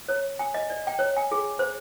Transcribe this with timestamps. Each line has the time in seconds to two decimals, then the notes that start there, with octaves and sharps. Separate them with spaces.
0.08 C#5
0.39 G#5
0.54 D#5
0.70 D5
0.87 G5
0.99 C#5
1.17 G#5
1.32 G#4
1.59 C5